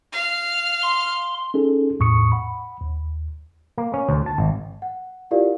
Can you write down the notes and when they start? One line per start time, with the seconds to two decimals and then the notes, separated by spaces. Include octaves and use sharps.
0.13 F5
0.83 C6
1.54 C#4 D#4 G#4 A4
1.99 B1 E2 A2 C#6 D#6 C#7
2.32 F#5 B5
2.81 D#2
3.78 A#3
3.94 C#4
4.09 D2
4.26 A5
4.38 G#1
4.82 F#5
5.31 E4 F4 G4 A#4 D5 F5